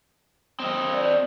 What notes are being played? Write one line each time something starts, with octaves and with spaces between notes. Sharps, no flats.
C4 D#5
D5